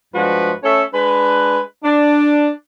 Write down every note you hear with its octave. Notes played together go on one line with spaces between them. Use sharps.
G2 F3 G#3 F#4 B4
A3 C#4 A4 C#5 E5
G#3 D4 B4
D4